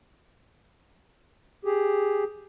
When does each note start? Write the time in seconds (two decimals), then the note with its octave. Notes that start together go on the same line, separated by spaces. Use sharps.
1.65 G4 G#4